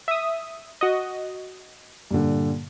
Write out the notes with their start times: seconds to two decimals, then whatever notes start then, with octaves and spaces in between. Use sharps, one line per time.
0.08 E5 D#6
0.81 F#4 D#5
2.11 G2 A#2 D3